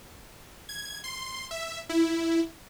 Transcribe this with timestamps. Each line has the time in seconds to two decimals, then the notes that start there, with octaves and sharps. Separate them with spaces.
0.69 G#6
1.04 C6
1.51 E5
1.89 E4